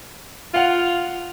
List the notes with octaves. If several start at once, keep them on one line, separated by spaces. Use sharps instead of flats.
F4 F5 F#5